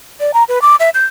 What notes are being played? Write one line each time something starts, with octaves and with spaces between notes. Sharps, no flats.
D5
A#5
B4
D6
E5
G6